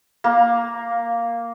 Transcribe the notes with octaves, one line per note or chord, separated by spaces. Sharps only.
A#3